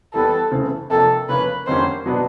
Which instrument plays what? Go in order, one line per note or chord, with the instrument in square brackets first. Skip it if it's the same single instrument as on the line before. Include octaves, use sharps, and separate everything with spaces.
[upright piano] E3 G3 B3 [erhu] A4
[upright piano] C#3 E3 A3 C4
[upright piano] C3 F3 A#3 D4 [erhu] A4
[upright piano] C#3 F3 A#3 C#4 F4 [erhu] B4
[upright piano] F2 D3 G3 A#3 C#4 [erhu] C5
[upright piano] B2 F#3 B3 D4